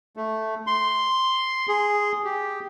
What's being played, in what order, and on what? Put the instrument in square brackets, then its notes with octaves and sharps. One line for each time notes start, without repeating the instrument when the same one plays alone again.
[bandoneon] A3
C6
G#4
G4